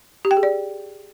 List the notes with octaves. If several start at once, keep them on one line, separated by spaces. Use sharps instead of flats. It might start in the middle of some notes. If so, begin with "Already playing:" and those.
G4
G5
G#4
D5